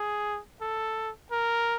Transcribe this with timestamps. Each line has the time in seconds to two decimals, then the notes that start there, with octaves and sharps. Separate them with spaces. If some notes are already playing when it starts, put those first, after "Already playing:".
Already playing: G#4
0.61 A4
1.31 A#4